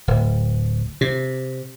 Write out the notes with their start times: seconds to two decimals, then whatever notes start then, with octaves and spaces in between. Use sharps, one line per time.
0.08 D1
1.01 C3